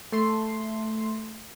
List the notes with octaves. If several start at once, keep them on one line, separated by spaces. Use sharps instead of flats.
A3 C6